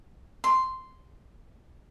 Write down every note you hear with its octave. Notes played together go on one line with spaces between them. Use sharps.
C6